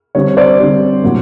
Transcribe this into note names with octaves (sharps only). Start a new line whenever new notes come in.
D3 G3 C4 C#5
C5 D5
D3 G3 C4
A2 F#3 A#3